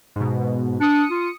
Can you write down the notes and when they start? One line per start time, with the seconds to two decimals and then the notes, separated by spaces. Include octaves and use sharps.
0.16 G#2 B2
0.81 D4 D#6 C#7
1.11 F4